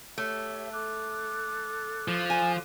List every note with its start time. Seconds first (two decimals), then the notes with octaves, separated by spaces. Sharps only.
0.18 A3 G4 C#5 E5
0.73 A4 D6 F#6
2.08 F3
2.30 G#5